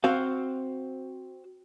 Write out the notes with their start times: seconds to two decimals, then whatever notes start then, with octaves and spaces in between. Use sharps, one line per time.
0.04 C4 F#4 C5 F5